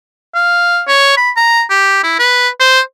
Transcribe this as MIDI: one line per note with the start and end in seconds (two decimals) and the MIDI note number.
0.35 0.82 77
0.88 1.16 73
1.17 1.31 83
1.37 1.63 82
1.70 1.99 67
2.04 2.15 64
2.19 2.49 71
2.60 2.81 72